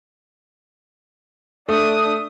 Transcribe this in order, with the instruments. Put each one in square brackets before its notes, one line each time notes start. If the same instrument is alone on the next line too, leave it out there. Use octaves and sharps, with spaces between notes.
[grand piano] A3 [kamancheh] D4 D#6